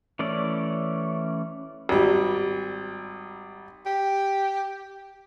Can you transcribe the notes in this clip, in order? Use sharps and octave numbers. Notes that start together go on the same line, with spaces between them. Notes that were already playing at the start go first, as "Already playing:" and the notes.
E3 A3 C#4 D5
G#1 G3
G4